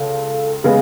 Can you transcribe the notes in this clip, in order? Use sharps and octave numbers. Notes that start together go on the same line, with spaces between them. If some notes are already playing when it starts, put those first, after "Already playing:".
Already playing: C#2 C#3 A4
C#3 G#3 B3 G#4